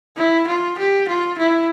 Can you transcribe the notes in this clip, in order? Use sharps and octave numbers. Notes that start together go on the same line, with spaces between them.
E4
F4
G4
F4
E4